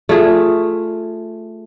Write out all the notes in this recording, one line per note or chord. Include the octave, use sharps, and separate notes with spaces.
A3 F4 G#4